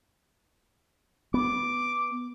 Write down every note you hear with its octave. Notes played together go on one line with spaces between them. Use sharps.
B3 D6